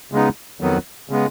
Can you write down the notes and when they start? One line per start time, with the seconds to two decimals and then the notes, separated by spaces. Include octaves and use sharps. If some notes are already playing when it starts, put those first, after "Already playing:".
0.12 C#3 G#3 B3 D#4
0.60 F2 D#3 F#3 B3
1.09 C#3 G#3 B3